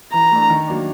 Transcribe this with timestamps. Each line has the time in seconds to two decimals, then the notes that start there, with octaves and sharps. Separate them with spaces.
0.13 E3 A#5
0.32 A3 D4
0.50 D#3
0.67 F#3 A#3 D4